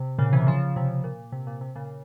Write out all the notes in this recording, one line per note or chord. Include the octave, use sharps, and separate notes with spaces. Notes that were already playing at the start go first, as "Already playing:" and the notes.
Already playing: C3
A#2 C#3
C3 E3
C#3 F3
C3
A#2
C3
A#2
C3
A#2 C#3